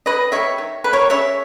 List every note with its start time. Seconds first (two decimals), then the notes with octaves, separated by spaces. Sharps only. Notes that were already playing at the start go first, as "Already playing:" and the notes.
0.06 D#3 B4 D#5
0.32 G3 A#3 C#5 E5
0.58 D#3
0.84 G3 A#3 B4
0.93 A#4 C#5
1.10 C#3 C#5 E5